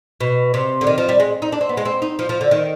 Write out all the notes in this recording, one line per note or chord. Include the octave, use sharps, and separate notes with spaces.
B2
C3
D3
D#3
F3
G3
G#3
D#4
D4
C4
B3
G#3
C4
D#4
F3
F3
D3
D#3